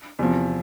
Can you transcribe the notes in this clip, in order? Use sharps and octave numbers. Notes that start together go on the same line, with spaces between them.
E2 C3 F3